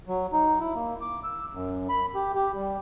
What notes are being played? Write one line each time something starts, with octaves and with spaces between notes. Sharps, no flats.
F#3
D#4
E4
A#3
D6
E6
F#2
B5
G4
G4
G3